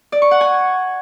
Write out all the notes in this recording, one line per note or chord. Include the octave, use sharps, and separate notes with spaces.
D5
C#6
F#5
G#5